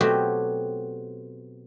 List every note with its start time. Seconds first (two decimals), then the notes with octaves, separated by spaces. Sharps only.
0.01 B2 F#3 A3 C4 F#4 G4